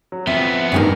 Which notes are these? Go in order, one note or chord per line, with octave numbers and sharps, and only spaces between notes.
F#3
F2 F3 B3 E5
A1 E2 G2 D#3 G4 A#4